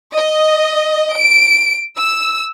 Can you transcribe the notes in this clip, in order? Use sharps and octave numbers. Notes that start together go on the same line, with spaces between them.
D#5
D7
E6